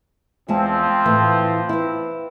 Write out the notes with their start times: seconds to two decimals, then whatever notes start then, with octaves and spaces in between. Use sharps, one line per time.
0.48 E2 F3 G#3 C4 A5
1.05 A2 E3 B4
1.69 E4 B4